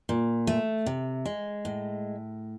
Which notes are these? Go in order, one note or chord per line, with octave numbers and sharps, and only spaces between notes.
A#2
A3
C3
G#3
A2